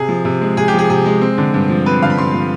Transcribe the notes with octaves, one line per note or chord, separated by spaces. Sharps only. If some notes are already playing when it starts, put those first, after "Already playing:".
Already playing: C3 G#4
F3
C3
G#3
C3 G#4
G4
F3
G#4
C3 G#4
G#3
C4
D3
G2
F3
C4 B4
D3 F5
B5
G2 C6
F3